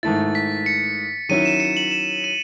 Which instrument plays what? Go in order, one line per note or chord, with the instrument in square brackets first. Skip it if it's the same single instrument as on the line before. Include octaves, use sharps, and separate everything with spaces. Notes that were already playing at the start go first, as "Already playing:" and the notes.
[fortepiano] G#2 D#3 A3 E4 [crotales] A6
[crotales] B6
C#7
[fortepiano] D#3 F#3 C#4 E4 [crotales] D#7
[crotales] E7
C#7
F#7
E7
D#7